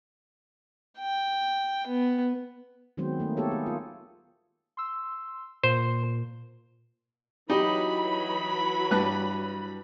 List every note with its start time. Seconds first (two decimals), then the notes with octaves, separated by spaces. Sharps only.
0.99 G5
1.87 B3
2.97 D#3 F#3 G#3 B3 C4 C5
3.20 A3 A#3 D#4
3.37 B3 G4 A4 C#5
3.51 G#4
3.66 F4
4.77 C6 E6
5.63 A#2 C5
7.50 E3 F#3 D#4 G4 D#5 B5
8.91 G2 B4 F#6